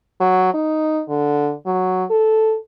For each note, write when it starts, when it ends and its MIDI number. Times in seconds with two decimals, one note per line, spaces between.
0.20 0.50 54
0.54 1.01 63
1.09 1.53 50
1.66 2.04 54
2.10 2.56 69